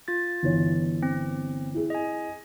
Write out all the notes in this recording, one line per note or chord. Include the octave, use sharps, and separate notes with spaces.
F4 A6
G1 E3 C#5
C4
E4 G#4
D#5 G#5